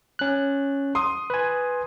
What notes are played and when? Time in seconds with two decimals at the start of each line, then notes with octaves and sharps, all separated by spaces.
0.19 C#4 F#6
0.95 C6 D#6
1.30 B4 G#5